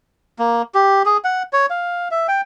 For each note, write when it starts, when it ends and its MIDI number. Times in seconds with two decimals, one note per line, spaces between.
0.39 0.62 58
0.74 1.02 67
1.06 1.17 68
1.24 1.43 78
1.53 1.66 73
1.70 2.08 77
2.11 2.27 76
2.28 2.41 79